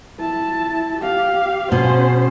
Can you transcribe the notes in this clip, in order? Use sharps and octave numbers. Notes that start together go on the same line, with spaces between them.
E4 A5
G4 F5
B2 C#4 C5